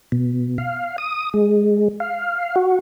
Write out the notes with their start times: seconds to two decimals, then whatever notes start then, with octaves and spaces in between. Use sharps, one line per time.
0.12 B2
0.58 F5
0.98 D#6
1.34 G#3
2.00 F5
2.56 F#4